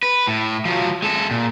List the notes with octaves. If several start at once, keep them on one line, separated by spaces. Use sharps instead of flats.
B4
A2
F3 F#3
G#3 A4
A#2